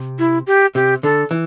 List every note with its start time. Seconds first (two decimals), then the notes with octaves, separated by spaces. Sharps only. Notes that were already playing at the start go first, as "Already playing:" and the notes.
Already playing: C3
0.19 E4
0.47 G4
0.75 C3 G4
1.03 D3 A4
1.31 E3